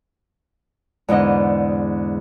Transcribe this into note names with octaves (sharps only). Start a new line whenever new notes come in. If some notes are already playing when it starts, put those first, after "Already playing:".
E2 G#2 D3 D#5